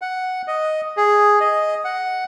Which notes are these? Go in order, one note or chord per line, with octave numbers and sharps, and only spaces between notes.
F#5
D#5
G#4
D#5
F#5